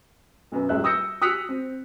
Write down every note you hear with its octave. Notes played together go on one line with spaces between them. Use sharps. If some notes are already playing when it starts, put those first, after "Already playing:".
B1 F#2 B4
D#1 C#2 E5 F#6
D#6 E6 G6 A#6 C#7
D#6 E6 F#6 B6 C#7 F7
C4